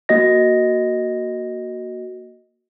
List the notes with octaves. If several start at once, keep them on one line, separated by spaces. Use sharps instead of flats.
A#3 F#4 D#5 A#6